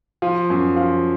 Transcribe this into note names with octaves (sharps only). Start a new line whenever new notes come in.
F3
F#2
F3